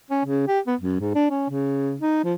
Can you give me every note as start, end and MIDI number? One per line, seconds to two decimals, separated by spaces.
0.11 0.20 61
0.25 0.45 49
0.48 0.59 67
0.67 0.75 59
0.81 1.00 42
1.00 1.15 44
1.15 1.27 62
1.30 1.48 61
1.50 1.95 49
2.01 2.22 63
2.24 2.34 53